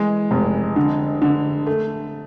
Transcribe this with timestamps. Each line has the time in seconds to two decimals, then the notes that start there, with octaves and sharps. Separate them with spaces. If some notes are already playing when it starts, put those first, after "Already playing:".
Already playing: E3 G#3
0.31 F1
0.76 D3
1.22 D3
1.66 A3